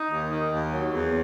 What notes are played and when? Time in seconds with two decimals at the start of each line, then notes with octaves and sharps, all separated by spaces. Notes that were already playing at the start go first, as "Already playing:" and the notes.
Already playing: D#4
0.10 D#2
0.31 D#3
0.52 D#2
0.73 F#3
0.93 E2